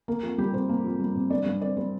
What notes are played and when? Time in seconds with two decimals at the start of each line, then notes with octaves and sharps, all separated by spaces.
0.08 A#3 A#4
0.23 F2
0.38 G3 G4
0.54 C3 C5
0.69 A#3
0.84 F2
1.00 G3
1.15 C3
1.30 G2 D5
1.46 G2
1.61 C4 D5
1.77 G3 C5